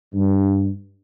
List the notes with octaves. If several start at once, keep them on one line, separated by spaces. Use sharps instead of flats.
G2